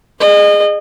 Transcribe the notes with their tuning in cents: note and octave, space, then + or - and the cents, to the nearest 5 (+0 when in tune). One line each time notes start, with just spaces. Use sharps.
G#4 -5 D#5 -30